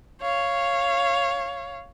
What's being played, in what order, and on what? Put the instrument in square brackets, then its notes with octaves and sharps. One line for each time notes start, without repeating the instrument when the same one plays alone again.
[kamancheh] C#5 F5